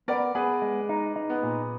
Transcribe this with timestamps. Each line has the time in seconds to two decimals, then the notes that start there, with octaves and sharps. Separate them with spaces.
0.08 B3 A#4 D5
0.35 B3 G#4 B4
0.62 G#3
0.89 D#4
1.16 D#4
1.30 B3
1.43 A#2